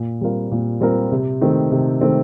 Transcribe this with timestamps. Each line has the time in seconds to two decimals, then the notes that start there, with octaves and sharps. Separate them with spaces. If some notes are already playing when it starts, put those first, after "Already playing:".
Already playing: A#2
0.21 G3 C4 F4 A#4
0.52 A#2
0.80 G3 C4 F4 A#4
1.12 C3
1.41 D#3 A3 C4
1.72 C3
2.01 D#3 A3 C4